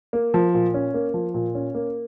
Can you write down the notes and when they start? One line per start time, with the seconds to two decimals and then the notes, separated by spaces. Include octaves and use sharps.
0.13 A#3
0.34 F3
0.54 A#2
0.74 C#4
0.94 A#3
1.14 F3
1.34 A#2
1.55 C#4
1.75 A#3